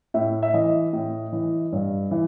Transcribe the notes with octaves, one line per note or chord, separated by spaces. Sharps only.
A2 E5
E5
E3 D#5
A2
E3
G2
E3